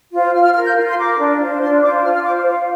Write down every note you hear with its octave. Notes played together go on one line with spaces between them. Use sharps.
F4 C5
F4 F6
F6
A#4 F6
G6
F4
C6
A#4 D6
D4
F4 C5
D4 C6
F4 C5 D6
F4 F6
F6
C5 D6
F4 F5